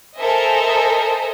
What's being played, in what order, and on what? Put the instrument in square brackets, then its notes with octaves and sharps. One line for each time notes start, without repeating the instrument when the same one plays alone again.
[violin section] A4 A#4 C5 D#5 E5 G#5